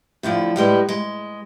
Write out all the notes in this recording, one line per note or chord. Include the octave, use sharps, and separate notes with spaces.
A2 D3 F3 E4
A2 G3 G#3 B4
G#3